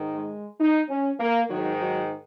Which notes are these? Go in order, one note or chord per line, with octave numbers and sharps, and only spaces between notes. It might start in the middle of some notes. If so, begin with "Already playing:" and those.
Already playing: G#2 D#3
G#3
D#4
C#4
A#3
G#2 D#3 F#3
F#3